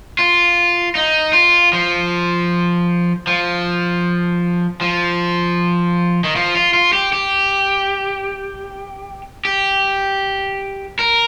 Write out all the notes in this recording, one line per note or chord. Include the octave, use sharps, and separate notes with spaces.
F4
D#4
F4
F3
F3
F3
D#3
F3
F4
F4
G4
G4
G4
A#4